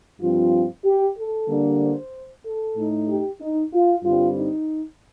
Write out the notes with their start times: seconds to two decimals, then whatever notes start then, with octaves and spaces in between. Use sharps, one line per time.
0.21 G2 F3 C4 F4
0.84 G4
1.17 A4
1.49 D3 G3 A#3 D4
1.81 C5
2.45 A4
2.76 A2 A3 D#4
3.09 G4
3.41 D#4
3.73 F4
4.04 G2 D3 G3 C4 F4
4.36 D#4